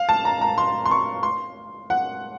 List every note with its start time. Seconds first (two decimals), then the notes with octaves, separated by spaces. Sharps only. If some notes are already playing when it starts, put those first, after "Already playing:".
Already playing: F5
0.09 A5
0.25 A#5
0.41 A#5
0.58 C6
0.86 C6
0.91 C#6
1.23 C6
1.90 F#5